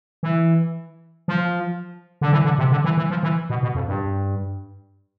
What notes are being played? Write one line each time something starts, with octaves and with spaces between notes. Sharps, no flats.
E3
F3
D3
E3
D3
C3
D3
E3
E3
F3
E3
B2
B2
F2
G2